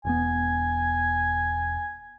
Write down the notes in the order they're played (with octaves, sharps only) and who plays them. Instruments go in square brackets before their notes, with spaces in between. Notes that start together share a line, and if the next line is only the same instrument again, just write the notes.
[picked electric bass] E1 E2 B3 [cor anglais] G#5